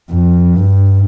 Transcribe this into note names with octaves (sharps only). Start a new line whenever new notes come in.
F2
G2